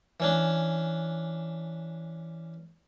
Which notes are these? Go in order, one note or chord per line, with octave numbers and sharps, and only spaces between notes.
E3 C#4 D4